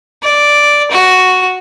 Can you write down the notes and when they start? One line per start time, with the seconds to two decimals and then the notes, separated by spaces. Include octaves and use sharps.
0.23 D5
0.91 F#4